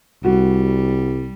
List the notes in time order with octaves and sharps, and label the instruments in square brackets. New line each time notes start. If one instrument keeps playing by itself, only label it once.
[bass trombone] C2 [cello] G3 [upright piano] F#4